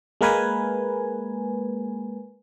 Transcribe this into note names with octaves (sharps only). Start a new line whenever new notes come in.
G#3 A#3 A#4 B4 G#5